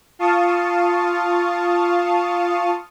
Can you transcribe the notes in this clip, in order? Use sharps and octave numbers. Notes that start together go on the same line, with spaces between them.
F4 F5 A5 C#6 D#6